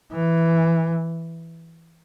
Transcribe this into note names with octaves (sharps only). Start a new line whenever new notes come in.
E3